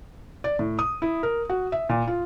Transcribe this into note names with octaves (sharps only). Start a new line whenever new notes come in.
D5
A2
D#6
E4
A#4
F#4
E5
A#2
F4